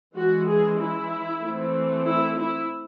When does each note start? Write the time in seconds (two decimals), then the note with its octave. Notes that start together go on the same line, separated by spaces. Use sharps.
0.15 E3 G#3 C#4 F#4
0.46 G#4
0.78 E4
1.42 E3 A3 C4
2.05 E4
2.37 E4